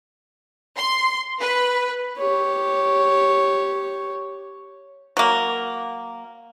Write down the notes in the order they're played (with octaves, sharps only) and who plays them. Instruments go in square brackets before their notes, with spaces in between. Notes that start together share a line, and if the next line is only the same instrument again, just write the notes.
[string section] C6
B4
[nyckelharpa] G4 C#5
[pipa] F#3 A#3